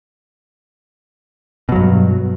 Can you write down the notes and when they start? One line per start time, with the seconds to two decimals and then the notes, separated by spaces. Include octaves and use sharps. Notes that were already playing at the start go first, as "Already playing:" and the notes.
1.69 B2
1.72 F#3
1.76 G2